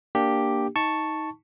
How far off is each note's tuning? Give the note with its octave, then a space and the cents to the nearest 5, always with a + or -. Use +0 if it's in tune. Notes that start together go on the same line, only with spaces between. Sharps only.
A#3 +0 D4 +0 G4 +0
D#4 +20 A5 +5 C#6 +0